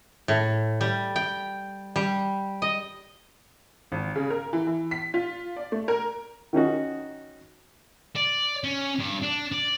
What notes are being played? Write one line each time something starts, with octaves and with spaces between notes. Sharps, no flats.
A2
G3
G5
G3
D#5
G#1
C#3
A#4
E3
E3
B6
F4
D5
A3
A#4
D#3 C#4 D#4 F#4
D5
C#4
G2
D4
D5